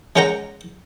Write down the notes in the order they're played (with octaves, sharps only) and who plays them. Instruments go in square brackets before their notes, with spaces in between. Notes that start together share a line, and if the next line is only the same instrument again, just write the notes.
[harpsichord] G#3 C#4 A#4 F#5 G5 A#5